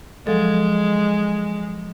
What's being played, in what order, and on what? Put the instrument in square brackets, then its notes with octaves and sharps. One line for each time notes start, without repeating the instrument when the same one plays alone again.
[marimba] F3 F#3 A4 [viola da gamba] G#3